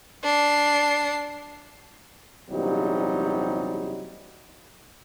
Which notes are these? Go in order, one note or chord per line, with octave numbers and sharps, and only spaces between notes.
D4 C7
A#1 E2 C3 F#3 G3 D#4